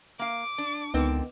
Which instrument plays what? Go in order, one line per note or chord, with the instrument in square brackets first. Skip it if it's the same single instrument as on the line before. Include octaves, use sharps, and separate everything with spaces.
[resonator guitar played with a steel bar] A#3 F5 [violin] D6
[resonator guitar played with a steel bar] D4
[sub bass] C#2 [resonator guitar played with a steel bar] D3 C4 A#4 [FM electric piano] B3 D#4